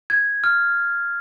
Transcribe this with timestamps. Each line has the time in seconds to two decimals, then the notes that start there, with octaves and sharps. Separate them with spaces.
0.10 G#6
0.44 F6